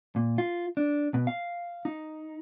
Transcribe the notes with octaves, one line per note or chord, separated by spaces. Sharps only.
A#2
F4
D4
B2
F5
D#4